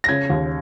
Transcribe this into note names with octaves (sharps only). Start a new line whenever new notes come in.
A#6
C#3 G#6
D#2